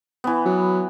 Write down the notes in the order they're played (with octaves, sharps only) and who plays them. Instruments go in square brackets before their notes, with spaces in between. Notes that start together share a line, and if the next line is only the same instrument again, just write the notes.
[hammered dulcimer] E3 B3
[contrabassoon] F#3